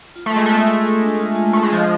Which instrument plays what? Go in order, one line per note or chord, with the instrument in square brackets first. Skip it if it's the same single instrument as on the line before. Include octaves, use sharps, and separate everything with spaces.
[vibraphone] F4
[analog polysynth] A3
[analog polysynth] G#3 [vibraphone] G#4
[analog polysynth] A3 [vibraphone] B3
[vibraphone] G#4
G#4
D4
F4
F4
[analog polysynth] A3 [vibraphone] F4
[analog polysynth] G#3
[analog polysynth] F3 [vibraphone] G#4